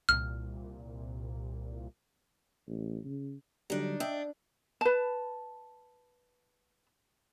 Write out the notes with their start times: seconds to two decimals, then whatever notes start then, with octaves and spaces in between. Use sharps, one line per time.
0.09 C2 A#2 F6
2.68 A1
3.05 C#3
3.70 D3 F#3 G3 D4 D#4
4.00 D4 D#5 E5 G5
4.81 B4 A5